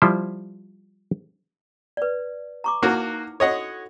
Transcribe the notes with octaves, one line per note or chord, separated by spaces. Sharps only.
F3 G3 E4 C5
B4 D5
A#5 C#6 D6
A#3 D#4 E4 F#4
F#4 A4 C#5 D#5 F#5